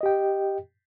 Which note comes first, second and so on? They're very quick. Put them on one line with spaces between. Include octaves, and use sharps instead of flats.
D#5 G4 G5